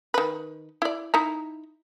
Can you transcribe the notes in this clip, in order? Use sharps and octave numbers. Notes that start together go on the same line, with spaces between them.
D#3 B4
E4 D5
D#4 E4 A#5